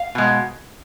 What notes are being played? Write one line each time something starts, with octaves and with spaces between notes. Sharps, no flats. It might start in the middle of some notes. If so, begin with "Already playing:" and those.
Already playing: F5
B2 G#3